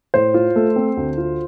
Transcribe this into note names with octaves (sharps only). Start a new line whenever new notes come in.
A2 C5
F4
A3
C4
D2
F4